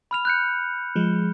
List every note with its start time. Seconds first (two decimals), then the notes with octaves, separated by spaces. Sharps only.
0.11 B5 F6 F7
0.25 F#6 G6 C#7
0.96 F3 G#3